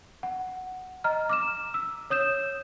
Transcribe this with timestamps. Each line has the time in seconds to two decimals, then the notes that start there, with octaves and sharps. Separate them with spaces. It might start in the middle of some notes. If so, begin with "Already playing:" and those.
0.23 F#5
1.04 D#5 A#5 F6
1.29 D6 F6 E7
1.74 E6
2.10 C#5 D#6 G6 E7